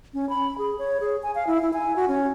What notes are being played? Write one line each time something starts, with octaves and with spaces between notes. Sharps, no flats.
C#4
B5
G#4
C#5
G#4
G#5
F5
E4
E4
G#5
F#4
C#4